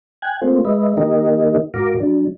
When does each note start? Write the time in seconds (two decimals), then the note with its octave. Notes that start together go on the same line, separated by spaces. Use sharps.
0.22 G5 G#5 F#6 G#6
0.42 A3 A#3 C4 F4 C5
0.65 G#3 B4 D#5 E5
0.97 D#3 A#3 D#4 G4 A#4 D#5
1.74 G#2 F#4 A#4 F5 A#5 D6
2.00 F#3 D4